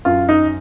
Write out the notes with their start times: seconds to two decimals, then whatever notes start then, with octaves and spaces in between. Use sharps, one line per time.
0.05 F#2 F4
0.29 D#4